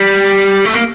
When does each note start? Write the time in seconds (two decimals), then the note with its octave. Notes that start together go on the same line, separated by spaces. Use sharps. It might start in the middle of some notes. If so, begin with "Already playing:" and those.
Already playing: G3
0.65 A3
0.74 A#3